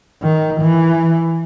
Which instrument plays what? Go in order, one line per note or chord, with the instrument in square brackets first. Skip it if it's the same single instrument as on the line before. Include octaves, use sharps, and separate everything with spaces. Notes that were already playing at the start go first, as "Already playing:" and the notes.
[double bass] D#3
E3